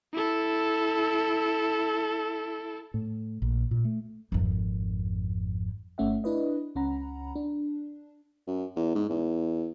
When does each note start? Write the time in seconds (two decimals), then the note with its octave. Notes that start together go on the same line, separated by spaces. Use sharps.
0.13 E4 A4
2.94 A2
3.42 A#1
3.71 A#2
3.85 A3
4.32 G#1 F2
5.98 G1 A3 C#4 E5 F#5
6.24 D4 E4 B4 D#5
6.75 C#2 C#4 F#5 A#5 B5
7.36 D4
8.47 F#2
8.76 E2
8.95 G#2
9.09 E2